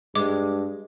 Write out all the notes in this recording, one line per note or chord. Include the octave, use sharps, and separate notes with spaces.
G2 G#3 D6